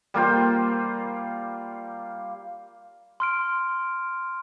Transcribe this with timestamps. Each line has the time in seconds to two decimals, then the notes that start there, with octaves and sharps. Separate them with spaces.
0.14 G3 A#3 F4 C5
3.20 C6 F6 D7